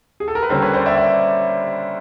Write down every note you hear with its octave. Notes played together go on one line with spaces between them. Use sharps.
G#4
A4
A#4
B4
D3 G3 A#3 C#4 A#4 C5
B4 C#5
C5 D5
D5 E5
D5 E5